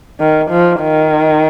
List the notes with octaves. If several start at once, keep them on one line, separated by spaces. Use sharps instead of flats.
D#3
F3
D#3